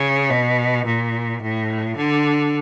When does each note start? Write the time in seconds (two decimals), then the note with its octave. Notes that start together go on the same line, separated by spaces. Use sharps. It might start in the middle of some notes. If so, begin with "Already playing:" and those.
Already playing: C#3
0.30 B2
0.86 A#2
1.42 A2
1.97 D3